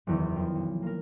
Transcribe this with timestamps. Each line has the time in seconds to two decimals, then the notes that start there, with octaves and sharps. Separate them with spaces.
0.07 F#1 E2 D#3
0.36 F2
0.55 B1
0.82 A#3 A#4